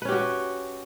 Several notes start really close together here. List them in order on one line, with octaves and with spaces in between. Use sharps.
B4 C#4 G4 F#4